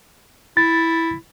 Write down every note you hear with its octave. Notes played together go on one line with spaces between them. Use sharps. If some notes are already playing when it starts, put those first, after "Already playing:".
E4 A6